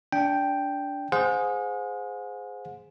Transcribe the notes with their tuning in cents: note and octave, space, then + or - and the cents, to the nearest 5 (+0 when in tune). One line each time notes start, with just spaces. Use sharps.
D4 -20 G5 +0
G#4 +0 C5 -15 F#5 -45